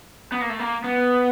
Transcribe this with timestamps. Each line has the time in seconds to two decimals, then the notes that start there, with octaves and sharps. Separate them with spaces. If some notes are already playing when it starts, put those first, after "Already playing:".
0.32 B3
0.41 A#3
0.49 A3
0.59 A#3
0.84 B3